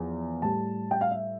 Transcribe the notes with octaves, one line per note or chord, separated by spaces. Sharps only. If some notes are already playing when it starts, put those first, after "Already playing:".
Already playing: E2 F3
A2 G3 A5
G5
F5
E5